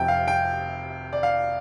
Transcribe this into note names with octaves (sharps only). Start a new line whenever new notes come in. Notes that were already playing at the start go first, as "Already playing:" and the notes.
Already playing: F1 F2 C3 G5
F5
G5
D5
F5